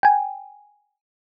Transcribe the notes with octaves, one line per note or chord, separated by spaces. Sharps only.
G5 G#5